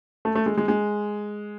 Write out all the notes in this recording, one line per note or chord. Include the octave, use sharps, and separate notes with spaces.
A3
A3
G#3
G#3
G#3